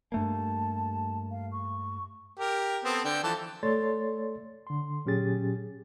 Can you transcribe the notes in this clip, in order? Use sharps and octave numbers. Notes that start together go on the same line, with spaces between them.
G2 A3 A#3 A5
F5
C#6
G4 A#4
B3 C4 A4
D3 G5
E3 F3 A4
A3 A4 C#5 D5 C6 A6
D3 C6
A#2 F#3 C#4 G4 G#4 A6